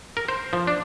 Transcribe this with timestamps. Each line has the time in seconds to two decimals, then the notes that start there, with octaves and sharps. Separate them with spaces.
0.17 A#4
0.29 C5
0.53 F3
0.67 D4